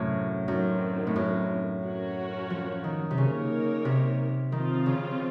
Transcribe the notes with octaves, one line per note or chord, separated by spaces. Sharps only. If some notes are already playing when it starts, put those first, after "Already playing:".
Already playing: F#2 A2 C3
F#2 D#3 F#3 C4
A2
F#2
C#4 F#4 A#4 C#5
F3
D#3
C3
C#3 A#3 D#4 A#4 C#5
C3
D#3 F3 C4 F4
C#3